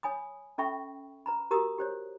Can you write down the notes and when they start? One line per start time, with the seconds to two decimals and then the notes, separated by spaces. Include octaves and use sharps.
0.03 C#5 G#5 B5 D#6
0.58 C#4 A4 E5 G5 B5 C#6
1.26 B4 A#5 B5
1.51 F#4 G4 A#4 A#5 D#6
1.78 G4 C5 C#5